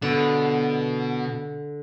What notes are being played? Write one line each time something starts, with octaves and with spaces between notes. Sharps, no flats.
B2 D3 A5